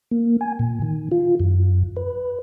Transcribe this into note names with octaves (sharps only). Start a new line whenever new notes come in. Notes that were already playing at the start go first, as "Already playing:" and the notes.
A#3
G#5
A#2
D#3
F4
F#2
B4